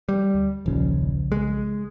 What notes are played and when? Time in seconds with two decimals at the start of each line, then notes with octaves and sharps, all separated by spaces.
0.09 G3
0.34 D2
0.66 D#1 B1 C#3 F3
1.32 G#3